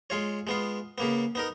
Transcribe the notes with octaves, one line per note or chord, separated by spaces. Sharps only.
G#3 F4 C#5
G#3 B3 F4
C#3 A#3 B3
B3 D#4 A#4